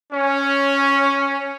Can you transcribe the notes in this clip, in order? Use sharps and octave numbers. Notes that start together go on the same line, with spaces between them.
C#4